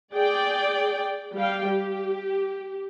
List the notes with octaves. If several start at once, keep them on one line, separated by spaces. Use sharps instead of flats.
G#4 D5 G5
G3 F5 G5
G4